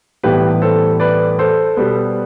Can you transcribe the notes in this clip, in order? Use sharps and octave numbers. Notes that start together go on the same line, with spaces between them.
A2 E3 G3 B3 G4 B4
A4 C5
B4 D5
A4 C5
B2 G3 B3